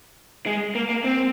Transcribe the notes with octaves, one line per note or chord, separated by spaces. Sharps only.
G#3
A#3
A#3
C4